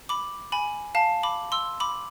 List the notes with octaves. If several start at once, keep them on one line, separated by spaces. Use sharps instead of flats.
B5 D6
G#5 B5
F5 A5
B5 D6
C6 E6
B5 D6